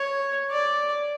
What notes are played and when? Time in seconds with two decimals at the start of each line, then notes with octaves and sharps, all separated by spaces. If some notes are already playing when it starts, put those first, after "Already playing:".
Already playing: C#5
0.51 D5